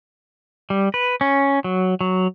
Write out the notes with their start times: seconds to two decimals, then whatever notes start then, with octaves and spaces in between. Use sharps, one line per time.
0.70 G3
0.94 B4
1.21 C#4
1.64 F#3
2.01 F#3